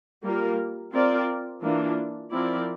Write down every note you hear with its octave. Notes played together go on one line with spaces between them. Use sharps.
G3 A#3 F4 A#4
C4 F4 A#4 D5
E3 A#3 D4 F4
F3 C4 E4 A#4 D5